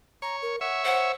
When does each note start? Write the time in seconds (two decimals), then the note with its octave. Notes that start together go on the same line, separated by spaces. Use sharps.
0.22 C#5 A#5
0.42 A#4
0.61 C#5 E5 F#5
0.85 C5 F#5